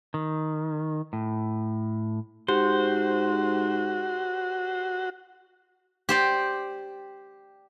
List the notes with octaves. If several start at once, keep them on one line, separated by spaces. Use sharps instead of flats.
D#3
A2
G#2 F#4 G4 C5
G4 C5 D5